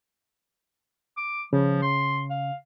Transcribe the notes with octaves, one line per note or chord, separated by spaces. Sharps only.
D6
C#3 F3
C6
F5